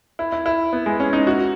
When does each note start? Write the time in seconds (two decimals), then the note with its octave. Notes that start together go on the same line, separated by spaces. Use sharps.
0.19 E4
0.32 E4
0.46 E4
0.73 B3
0.86 G#3
1.00 C#4
1.13 D#4
1.27 F#4